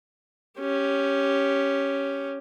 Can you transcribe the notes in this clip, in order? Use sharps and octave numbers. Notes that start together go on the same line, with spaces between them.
C#4 G4